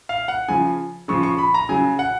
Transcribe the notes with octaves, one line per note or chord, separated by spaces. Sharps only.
F5
F#5
C#3 F3 G#5
C#3 F3 C#6
C#6
B5
A#5
C#3 F#3 G#5
F#5